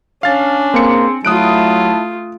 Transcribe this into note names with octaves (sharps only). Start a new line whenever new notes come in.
C#4 D4 F5 A6
A#3 C4 G#4 C6 C#7
F#3 A3 E4 F4 A5 D#6 F#6 D7